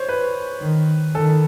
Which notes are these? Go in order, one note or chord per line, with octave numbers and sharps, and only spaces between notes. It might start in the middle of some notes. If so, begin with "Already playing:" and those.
Already playing: C5 C#5
B4
D#3
D#3 A4